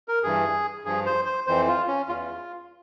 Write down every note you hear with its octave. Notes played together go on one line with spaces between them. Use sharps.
A#4
G2 E3 G#4
G2 F3 G#4
C5
C5
F2 E3 C5
F4
C#4
E2 E3 F4